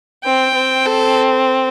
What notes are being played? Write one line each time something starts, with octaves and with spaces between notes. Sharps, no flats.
C4 G5
C4
A4